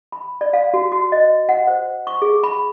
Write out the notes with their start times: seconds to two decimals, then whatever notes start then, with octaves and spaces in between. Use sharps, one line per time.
0.12 B5
0.41 D5
0.53 F5
0.74 F#4
0.92 F#4
1.12 D#5
1.49 F#5
1.67 C5
2.07 C#6
2.22 G#4
2.43 B5